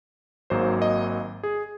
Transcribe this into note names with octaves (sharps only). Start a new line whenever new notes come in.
G#1 G#2 F#3 A#3 C5
D#5
G#4